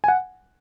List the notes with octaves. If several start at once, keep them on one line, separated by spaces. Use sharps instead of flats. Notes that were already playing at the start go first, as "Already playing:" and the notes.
G#5
F#5